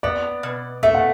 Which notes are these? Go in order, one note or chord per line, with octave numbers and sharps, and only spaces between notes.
B3 D5
B2
A3 E5
F#5